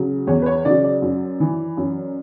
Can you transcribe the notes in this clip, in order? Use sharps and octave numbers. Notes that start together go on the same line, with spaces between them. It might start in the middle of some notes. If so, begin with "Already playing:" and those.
Already playing: C#3 F#3
E2 C#5
B4
C#5
C#3 F#3 D5
D5
F#2
E3
F#2